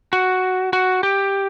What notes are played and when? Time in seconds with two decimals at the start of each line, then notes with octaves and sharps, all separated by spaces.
0.13 F#4
0.73 F#4
1.03 G4